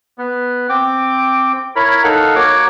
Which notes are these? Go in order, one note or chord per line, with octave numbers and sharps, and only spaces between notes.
B3
C4 G5 D6
E4 A#4 C#5 B5
D#4 A4 A#4 F5 F#5
A#3 F#4 C#5 D6